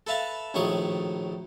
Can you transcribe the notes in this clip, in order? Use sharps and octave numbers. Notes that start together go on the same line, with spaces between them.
A4 B4 E5 F5 A5
A#1 A2 D#3 F#3 C#6 D#6